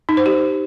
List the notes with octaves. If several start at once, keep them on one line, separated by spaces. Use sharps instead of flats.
D#4
C5
G4